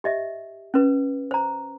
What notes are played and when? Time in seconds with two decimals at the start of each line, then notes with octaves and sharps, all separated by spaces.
0.04 G4 D#5 E5
0.74 C#4 B4
1.31 C5 A#5